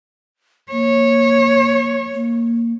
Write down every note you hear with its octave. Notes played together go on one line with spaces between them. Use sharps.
A#3 C#5
A#3